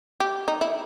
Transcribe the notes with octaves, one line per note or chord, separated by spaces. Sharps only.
G4
D#4
E4